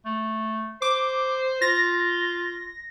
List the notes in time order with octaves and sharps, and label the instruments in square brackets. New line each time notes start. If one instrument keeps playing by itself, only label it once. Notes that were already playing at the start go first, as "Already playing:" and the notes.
[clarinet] A3
[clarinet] C5 [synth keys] D6
[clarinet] F4 [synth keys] A#6